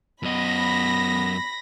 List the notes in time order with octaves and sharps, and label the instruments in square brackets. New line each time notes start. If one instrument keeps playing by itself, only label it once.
[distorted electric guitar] F#2 D#5 [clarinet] B3 [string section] B5 A#6